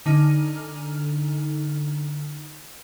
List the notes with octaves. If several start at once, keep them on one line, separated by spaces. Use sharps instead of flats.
D3 D#4 G#5 F6